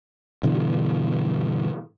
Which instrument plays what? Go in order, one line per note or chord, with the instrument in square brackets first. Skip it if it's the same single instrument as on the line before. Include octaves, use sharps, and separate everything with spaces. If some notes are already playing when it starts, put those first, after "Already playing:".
[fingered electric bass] G2 B2 D3 E3